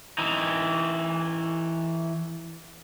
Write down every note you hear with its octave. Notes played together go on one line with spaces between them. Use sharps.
E3 D#4